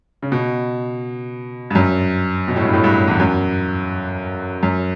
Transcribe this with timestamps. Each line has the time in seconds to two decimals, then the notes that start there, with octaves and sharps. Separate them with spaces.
0.23 C#3
0.32 B2
1.70 G2
1.75 F#2
2.48 B2
2.56 A2
2.65 G2
2.73 A2
2.84 G2
3.08 E2
3.20 F#2
4.63 F#2